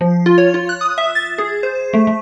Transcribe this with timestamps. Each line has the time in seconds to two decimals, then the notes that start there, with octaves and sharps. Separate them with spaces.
0.01 F3
0.26 F4
0.38 C#5
0.54 F4
0.69 F#6
0.81 D#6
0.98 E5
1.15 A6
1.38 G#4
1.63 C5
1.93 A3
2.07 A3